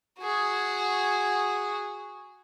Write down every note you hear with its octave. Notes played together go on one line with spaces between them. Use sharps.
F#4 G#4